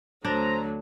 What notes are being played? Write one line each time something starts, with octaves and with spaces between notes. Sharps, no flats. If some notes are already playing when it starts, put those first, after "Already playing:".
D2 D3 F#3 D4 C5 A#5